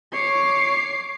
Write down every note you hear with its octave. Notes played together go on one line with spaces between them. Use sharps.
C#5 D6 C7